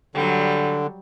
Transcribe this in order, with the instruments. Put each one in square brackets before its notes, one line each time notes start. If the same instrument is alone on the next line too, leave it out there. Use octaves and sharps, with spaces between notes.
[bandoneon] D3 [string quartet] F#3 G3